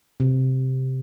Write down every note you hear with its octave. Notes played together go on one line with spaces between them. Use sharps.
C3